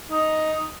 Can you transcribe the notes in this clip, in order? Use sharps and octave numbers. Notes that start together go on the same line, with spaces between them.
D#4